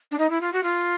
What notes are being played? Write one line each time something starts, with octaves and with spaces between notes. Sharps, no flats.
D4
D#4
E4
F4
F#4
F4